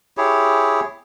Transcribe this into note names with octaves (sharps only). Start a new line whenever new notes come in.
E4 G4 G#4 C#5